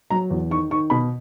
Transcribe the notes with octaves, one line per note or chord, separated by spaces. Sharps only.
F#3 A#5
E2
D#3 C#6
D#3 C#6
B2 B5